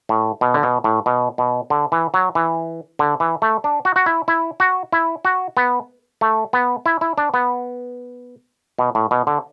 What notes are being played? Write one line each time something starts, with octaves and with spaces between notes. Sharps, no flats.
A2
B2
D3
B2
A2
B2
B2
D3
E3
F#3
E3
D3
E3
A3
D4
F#4
F#4
E4
E4
F#4
E4
F#4
B3
A3
B3
E4
E4
D4
B3
B2
A2
B2
D3